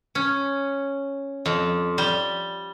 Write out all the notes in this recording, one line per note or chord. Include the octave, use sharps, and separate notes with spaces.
C#4
F2
G3